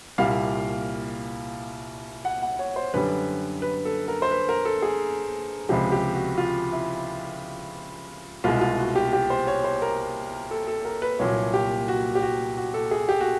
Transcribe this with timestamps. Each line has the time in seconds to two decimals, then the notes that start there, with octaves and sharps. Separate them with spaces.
0.18 C2 A#2 G3 F5
2.25 F#5
2.42 F#5
2.59 C#5
2.76 C5
2.94 F#2 D3 G3 B4
3.62 B4
3.85 A4
4.08 A#4
4.22 C5
4.31 B4
4.49 A#4
4.65 A4
4.82 G#4
5.69 C#2 C3 F3 G#3 G4
5.92 G4
6.15 F#4
6.38 F4
6.72 E4
8.44 C2 B2 G#3 F4
8.61 F4
8.78 F#4
8.95 G4
9.13 G4
9.30 C5
9.47 C#5
9.64 C5
9.82 A#4
10.51 A4
10.68 A4
10.85 A#4
11.02 B4
11.19 C2 A#2 F#3 C#5
11.54 G4
11.88 F#4
12.15 G4
12.22 F#4
12.57 F#4
12.74 A4
12.91 G#4
13.09 G4
13.20 F#4